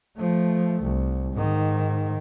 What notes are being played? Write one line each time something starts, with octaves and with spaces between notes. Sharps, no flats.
F3 A3
C2
G#2 D#3